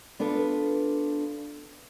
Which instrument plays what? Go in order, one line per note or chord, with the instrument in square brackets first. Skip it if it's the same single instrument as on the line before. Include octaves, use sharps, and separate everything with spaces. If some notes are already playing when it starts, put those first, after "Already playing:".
[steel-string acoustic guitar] B3 D4 F4 A4 B4